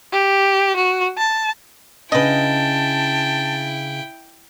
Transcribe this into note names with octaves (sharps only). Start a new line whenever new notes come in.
G4
F#4
A5
C#3 D4 E4 B4 D#5 G5 A5